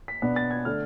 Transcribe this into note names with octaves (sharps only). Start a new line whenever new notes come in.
B6
B2 B3 D4
A6
G#6
D3 A3 D4 F6